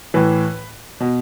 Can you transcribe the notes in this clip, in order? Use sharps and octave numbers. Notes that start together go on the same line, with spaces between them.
A2 E3 B4
B2